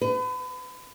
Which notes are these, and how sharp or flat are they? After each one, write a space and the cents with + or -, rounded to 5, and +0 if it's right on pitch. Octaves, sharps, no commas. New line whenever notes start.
B4 +35